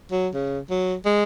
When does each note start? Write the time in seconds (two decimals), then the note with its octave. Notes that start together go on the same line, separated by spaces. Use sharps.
0.11 F#3
0.34 C#3
0.70 F#3
1.05 G#3